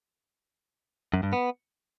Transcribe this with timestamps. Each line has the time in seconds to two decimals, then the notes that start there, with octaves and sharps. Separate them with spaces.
1.14 F#2
1.23 G2
1.33 B3